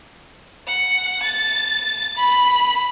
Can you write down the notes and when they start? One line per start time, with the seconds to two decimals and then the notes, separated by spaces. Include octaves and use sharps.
0.67 F#5
1.23 A6
2.17 B5